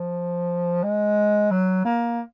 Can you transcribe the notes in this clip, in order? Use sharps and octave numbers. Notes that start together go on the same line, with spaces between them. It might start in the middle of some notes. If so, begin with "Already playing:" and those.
Already playing: F3
G#3
F#3
A#3